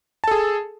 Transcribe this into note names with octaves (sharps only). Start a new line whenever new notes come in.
G#4 A4 A5